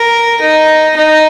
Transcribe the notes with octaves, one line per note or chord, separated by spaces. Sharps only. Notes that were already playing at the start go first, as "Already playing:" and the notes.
Already playing: A#4
D#4
D#4